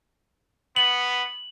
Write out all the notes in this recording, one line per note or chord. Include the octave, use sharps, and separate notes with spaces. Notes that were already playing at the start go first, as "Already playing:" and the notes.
B3 F#7